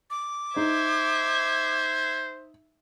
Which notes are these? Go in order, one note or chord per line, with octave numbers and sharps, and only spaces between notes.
D6
D#4 C5 E5 G#6